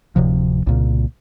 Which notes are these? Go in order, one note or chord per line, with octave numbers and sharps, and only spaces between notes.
D1 C3 F3
C2 A#2 C#3